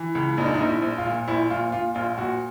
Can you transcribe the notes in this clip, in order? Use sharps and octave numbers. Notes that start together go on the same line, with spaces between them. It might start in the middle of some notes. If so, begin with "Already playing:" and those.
Already playing: E3
C#2
A#1 D#4
D4
D#4
A#1
E4
A#1
F4
A#2
A#1 E4
A#2 F4
A#2 F4
A#1 F4
A#2 F#4